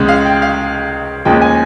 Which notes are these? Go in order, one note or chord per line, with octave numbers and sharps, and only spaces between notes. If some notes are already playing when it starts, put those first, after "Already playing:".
Already playing: C#2 C#3 G#3
F5
G5
F5
D#2 C#3 F3 G#3 G5
G#5